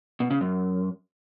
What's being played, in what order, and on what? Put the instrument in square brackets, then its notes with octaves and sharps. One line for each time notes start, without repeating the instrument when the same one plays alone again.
[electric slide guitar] B2
C#3
F#2